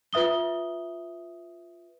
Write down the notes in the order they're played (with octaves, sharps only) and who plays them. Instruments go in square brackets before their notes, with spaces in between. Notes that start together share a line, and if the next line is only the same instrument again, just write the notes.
[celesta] F4 B4 E5 D#6 G7